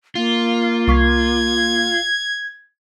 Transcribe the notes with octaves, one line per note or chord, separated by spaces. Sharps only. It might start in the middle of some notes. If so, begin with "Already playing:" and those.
A#3 F4
C2 C#6 G#6 B6